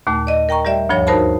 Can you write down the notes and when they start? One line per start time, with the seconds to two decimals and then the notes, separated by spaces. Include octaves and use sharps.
0.07 D#2 A#2 A3
0.27 D5 D#5
0.49 A#4 G5 A#5 C#6
0.65 G3 G4 D5 E5
0.89 D2 G2 F3 C#5
1.07 D#4 F#4 A#4 C5 A5 B5